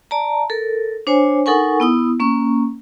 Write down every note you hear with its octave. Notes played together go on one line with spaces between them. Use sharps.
D5 A5 A#5
A4 A#4
D4 C5 C#5 G#5
D#4 A4 A#4 F#5 G#5 C#6
B3 E4 D#6
A#3 C#4 C#6